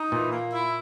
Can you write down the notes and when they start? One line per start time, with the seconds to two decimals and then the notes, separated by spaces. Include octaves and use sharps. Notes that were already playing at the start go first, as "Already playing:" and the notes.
Already playing: D#4
0.11 A#2 E3
0.32 A#3
0.52 E4